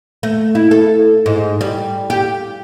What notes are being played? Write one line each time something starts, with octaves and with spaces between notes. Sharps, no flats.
A3
E4
A4
G#2
G3
G4